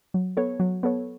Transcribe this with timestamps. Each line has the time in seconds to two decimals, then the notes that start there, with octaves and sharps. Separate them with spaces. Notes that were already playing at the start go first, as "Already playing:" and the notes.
0.14 F#3
0.37 B3 A4 C#5
0.60 F#3
0.83 B3 A4 C#5